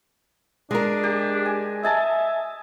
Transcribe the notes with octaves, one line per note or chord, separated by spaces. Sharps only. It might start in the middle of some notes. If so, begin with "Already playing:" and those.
G#3 D4 A#4
G4
G#5
D#5 E5 G#5 A5